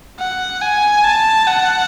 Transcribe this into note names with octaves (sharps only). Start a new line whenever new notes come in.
F#5
G#5
A5
F#5